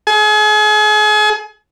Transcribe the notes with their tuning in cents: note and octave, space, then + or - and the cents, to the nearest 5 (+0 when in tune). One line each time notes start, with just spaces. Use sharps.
G#4 +35